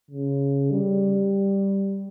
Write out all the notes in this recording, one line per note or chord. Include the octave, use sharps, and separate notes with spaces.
C#3
G3